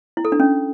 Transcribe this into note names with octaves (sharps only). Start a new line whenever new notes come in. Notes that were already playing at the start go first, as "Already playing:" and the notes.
E4
A4
D4
C#4